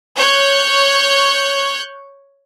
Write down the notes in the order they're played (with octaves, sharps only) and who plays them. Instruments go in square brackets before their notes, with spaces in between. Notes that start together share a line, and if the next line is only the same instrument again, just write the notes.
[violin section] C#5 C#6 F#6 G6